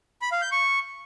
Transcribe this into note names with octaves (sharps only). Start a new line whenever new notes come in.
B5
F5
G6
C#6